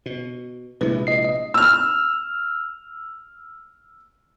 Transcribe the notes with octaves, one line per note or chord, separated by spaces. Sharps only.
B2
A#1 C3 G#3 E4 B4
D#5 C7
D#5
E6 F6